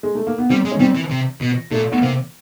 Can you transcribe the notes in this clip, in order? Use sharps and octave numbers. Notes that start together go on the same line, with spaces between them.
G#3
A3
A#3
B3
G3 C4
G#3
C#4
G3 C4
E3
C3
B2
A#2 A3
B3
C3 A#3